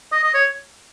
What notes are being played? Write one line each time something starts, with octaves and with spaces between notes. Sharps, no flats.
D#5
D#5
C#5